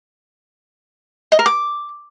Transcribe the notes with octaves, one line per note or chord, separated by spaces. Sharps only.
D#5
A#4
D6